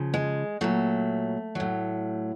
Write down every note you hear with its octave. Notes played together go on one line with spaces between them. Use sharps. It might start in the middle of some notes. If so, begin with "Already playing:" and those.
Already playing: C#3 F3
G#3
A#2 F#3 A3
A2 F#3